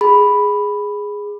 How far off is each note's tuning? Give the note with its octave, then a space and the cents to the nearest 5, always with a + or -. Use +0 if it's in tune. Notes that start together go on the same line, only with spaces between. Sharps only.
G#4 -5 B5 +0